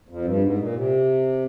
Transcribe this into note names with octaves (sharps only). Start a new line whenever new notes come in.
F2
G2
G#2
A#2
C3